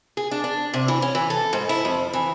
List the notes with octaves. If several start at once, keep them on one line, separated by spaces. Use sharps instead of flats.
G#4
D4
D4
C3
E3
C#4
E3
A4
G#2
E4
F2
E3